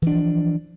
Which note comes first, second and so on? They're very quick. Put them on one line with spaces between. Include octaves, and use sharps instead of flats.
E3 D4 F3